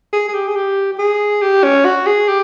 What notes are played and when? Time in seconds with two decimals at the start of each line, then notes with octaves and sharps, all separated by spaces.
0.13 G#4
0.28 G#4
0.34 G4
0.48 G#4
0.56 G4
0.92 G4
0.99 G#4
1.42 G4
1.64 C#4
1.85 F#4
2.06 G#4
2.28 G4